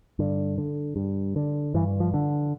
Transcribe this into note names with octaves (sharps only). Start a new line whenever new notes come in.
G2 D3
D3
G2
D3
G2 E3
F3
D3